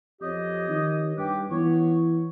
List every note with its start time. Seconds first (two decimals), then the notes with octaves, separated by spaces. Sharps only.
0.22 F2 G4 C#5 D#5
0.69 D#3
1.17 G2 B4 G5 D6
1.51 E3 B3 C#5